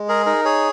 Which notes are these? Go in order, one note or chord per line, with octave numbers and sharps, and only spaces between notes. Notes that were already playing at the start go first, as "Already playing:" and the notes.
Already playing: G#3
G#4 A#4
D#4 A#4
G#4 C#5